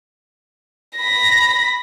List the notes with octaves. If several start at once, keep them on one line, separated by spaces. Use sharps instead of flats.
B5 A#6